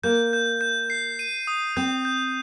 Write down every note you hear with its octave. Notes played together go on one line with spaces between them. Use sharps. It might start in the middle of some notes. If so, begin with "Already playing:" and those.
A#3 G6
G6
G6
C7
D#7
D#6
C4 G6
G6